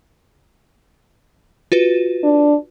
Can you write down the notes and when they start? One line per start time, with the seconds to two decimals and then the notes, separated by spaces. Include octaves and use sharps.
1.72 F4 F#4 B4
2.23 D4